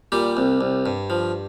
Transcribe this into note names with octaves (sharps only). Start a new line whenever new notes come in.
A#2 G3 G4
C2
C2
G2
F3